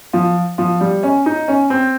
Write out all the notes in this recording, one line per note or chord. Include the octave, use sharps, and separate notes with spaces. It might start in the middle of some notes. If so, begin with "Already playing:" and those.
F3
F3
G3
C#4
D#4
C#4
C4